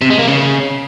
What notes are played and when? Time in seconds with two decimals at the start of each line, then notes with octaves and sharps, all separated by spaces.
0.02 C3
0.10 G#3
0.19 A#3
0.28 C#3